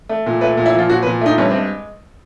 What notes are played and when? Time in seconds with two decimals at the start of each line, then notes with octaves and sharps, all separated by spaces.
0.09 A3
0.26 A#2
0.41 A3 B4
0.57 A#2
0.66 E4
0.74 F3 F4
0.89 A#2 F#4
1.03 B4
1.06 A#2
1.21 A3 D#4
1.38 G2 C#4
1.50 C4
1.54 G#3